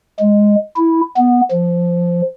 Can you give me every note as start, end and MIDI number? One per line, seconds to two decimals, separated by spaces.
0.20 0.55 56
0.76 1.00 64
1.17 1.41 59
1.51 2.21 53